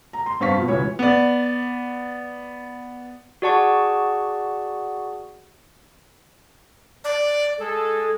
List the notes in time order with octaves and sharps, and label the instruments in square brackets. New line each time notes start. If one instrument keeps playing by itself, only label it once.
[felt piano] A#5
C6
G2 C4 F5 C#6 B6
B2 F3
C#2 E3 F#3 C#5
[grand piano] B3 D5
[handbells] F#4 G#4 D5 F#5 A5 C#6
[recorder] D5
[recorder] G#3 [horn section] A4